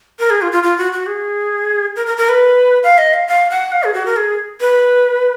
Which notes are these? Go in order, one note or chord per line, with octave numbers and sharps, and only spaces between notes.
A#4
G#4
F4
F4
F4
F#4
F#4
G#4
A#4
A#4
A#4
B4
F5
D#5
F5
F5
F#5
F5
G#4
F#4
A#4
G#4
B4